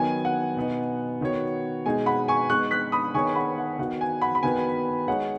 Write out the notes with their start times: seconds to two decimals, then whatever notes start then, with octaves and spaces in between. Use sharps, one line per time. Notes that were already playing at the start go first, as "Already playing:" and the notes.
Already playing: D#3 F#3 B3 G#5
0.25 F#5
0.57 B2 B3 D#4
1.21 D#3 B3 F#4 C#5
1.86 B2 G#3 D#4 G#4 G#5
2.06 F#5 B5
2.28 G#5 C#6
2.50 G#3 B3 D#4 C#6 F#6
2.71 F#6 B6
2.92 B5 D#6
3.14 D#3 B3 G#4 C#5 G#5 C#6
3.35 F#5 B5
3.58 F#5
3.79 D#3 B3 F#4 F#5
4.01 G#5
4.21 F#5 B5
4.35 B5
4.43 D#3 B3 F#4 B4 G#5
5.08 G#3 D#4 G#4 C#5 F#5